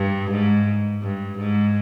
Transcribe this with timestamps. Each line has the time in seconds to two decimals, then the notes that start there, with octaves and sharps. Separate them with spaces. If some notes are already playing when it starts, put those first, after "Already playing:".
Already playing: G2
0.31 G#2
1.02 G2
1.38 G#2